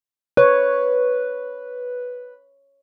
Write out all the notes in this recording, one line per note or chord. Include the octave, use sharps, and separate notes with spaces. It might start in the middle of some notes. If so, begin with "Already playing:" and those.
B4 C#5